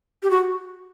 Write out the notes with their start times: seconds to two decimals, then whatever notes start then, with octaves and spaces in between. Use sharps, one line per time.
0.23 G4
0.31 F#4